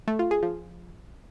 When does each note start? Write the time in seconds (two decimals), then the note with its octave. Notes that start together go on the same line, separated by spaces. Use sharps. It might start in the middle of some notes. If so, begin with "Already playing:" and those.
0.08 A3
0.19 F4
0.31 G#4
0.43 F3